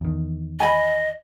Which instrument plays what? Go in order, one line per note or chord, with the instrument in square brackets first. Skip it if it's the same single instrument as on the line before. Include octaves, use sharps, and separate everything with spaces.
[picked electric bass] E2 D#3
[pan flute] D#5 [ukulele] G#5 B5